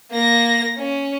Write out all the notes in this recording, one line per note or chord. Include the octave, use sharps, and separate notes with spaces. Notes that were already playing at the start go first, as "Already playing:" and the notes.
A#3 A#6
C#4